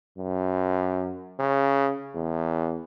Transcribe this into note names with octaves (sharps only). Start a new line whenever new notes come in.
F#2
C#3
E2